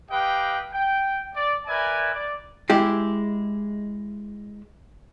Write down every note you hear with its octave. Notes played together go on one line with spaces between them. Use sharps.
G4 B4 D#5 F5 G5
G5
D5
A#4 B4 D5 E5 G#5
D5
G#3 E4 G4